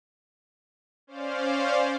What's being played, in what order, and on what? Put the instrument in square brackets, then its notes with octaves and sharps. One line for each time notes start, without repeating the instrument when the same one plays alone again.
[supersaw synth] C#4 C5 D5 F5